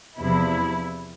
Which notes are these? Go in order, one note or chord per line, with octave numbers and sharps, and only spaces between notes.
E2 C3 F3 E4